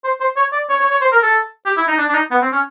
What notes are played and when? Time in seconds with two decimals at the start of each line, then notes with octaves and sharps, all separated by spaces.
0.04 C5
0.20 C5
0.37 C#5
0.52 D5
0.69 C#5
0.80 C#5
0.90 C#5
1.01 C5
1.12 A#4
1.23 A4
1.66 G4
1.77 E4
1.88 D#4
1.98 D4
2.09 D4
2.14 D#4
2.31 B3
2.42 C4
2.52 C#4